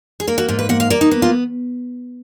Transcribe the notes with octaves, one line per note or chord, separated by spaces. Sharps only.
G#4
A#3 A#4
F#4
G#2 F4
B4
A#3 F#5
F5
A#3 D5
D#4
B3
F4